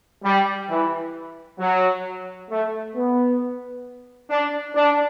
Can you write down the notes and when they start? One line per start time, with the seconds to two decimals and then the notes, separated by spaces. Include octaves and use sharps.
0.24 G3
0.69 E3
1.59 F#3
2.50 A3
2.96 B3
4.30 D4
4.75 D4